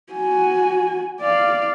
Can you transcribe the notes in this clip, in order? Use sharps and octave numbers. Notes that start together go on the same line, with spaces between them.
F#4 G#5
D5 F5